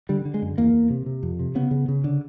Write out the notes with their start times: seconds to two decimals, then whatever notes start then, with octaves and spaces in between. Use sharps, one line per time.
0.09 D3 G3
0.25 D3
0.34 G#3
0.42 F#2
0.58 E2 A#3
0.74 E2
0.90 C3
1.06 C3
1.23 F2
1.39 C3
1.55 C#3 B3
1.71 C#3
1.88 C#3
2.04 D3